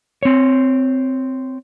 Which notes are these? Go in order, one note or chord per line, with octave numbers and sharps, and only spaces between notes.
C4 C#5